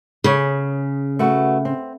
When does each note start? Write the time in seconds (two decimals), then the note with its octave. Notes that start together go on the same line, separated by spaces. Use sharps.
0.24 C#3 G#4 C#5
1.19 A3 F#4 B4
1.65 C4